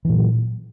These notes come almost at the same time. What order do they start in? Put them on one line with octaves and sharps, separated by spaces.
E3 A#2 F#3